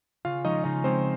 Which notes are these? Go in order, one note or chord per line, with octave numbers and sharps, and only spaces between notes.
C#3 F4 F5
F3 G#3 C#4 D#4 D#5
C#3 D#4 D#5
F3 G#3 C4 C#4 C5